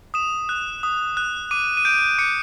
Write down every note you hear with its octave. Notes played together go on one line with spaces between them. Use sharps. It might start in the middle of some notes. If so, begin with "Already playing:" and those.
D#6 E7
F#6
D#6
F#6
D6 D#7
D#7
G6 D7
D6 C#7